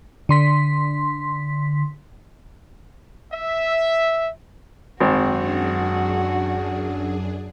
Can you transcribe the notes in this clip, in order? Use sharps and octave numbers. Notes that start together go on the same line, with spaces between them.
D3 C6 B6
E5
G#1 F#2 C4 D4 F#4 G#4